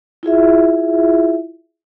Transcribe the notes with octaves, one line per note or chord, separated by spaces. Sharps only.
E4 F4 G#4 E5